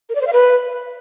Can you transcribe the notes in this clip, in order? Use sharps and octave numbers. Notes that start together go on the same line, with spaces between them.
A#4
D5
C5
F5
B4